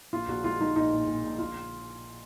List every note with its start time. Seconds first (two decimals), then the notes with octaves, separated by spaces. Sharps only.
0.13 A#1 F4
0.28 A#1 F#4
0.44 G#3 F4
0.60 G#3 D#4
0.76 A#1 D#4
0.92 A#2
1.07 A#2
1.24 A#1
1.39 F4